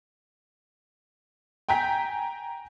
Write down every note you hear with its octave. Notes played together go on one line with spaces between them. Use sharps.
G5 G#5 A#5 G6 B6